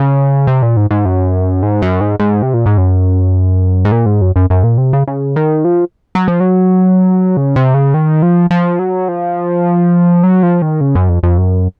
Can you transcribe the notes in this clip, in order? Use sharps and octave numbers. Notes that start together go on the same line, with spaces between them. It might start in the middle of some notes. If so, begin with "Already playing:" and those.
Already playing: C#3
C3
A#2
G#2
G#2
F#2
G#2
F#2
G#2
G#2
C3
A#2
G#2
F#2
G#2
A#2
G#2
F#2
F#2
F#2
A#2
C3
C#3
C#3
D#3
F3
F#3
F3
F#3
C#3
C3
C#3
D#3
F3
F3
F#3
F3
F#3
F3
D#3
C#3
F#2
F2
F2
F#2